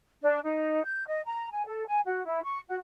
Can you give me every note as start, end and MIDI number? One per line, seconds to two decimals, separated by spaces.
0.22 0.39 62
0.44 0.82 63
0.84 1.05 91
1.07 1.20 75
1.26 1.51 82
1.51 1.65 80
1.66 1.84 69
1.87 1.99 80
2.06 2.24 66
2.25 2.43 64
2.44 2.60 85
2.68 2.76 66